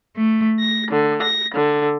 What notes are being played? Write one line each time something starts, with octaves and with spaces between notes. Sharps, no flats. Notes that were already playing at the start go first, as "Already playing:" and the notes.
A3
A#6
D3
A#6
D3